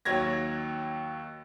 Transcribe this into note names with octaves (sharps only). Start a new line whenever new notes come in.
D#2 F#3 C#5 G#6 A#6